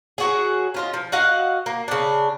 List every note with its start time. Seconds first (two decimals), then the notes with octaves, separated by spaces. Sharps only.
0.18 F#3 F#4 G#4
0.74 C#4 F4 D#5
0.94 F3
1.12 F#4 D#5 F5 F#5
1.66 A#3
1.88 C#3 D4